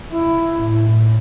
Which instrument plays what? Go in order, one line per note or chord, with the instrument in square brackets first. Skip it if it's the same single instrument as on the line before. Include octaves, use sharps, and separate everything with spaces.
[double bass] E4
A2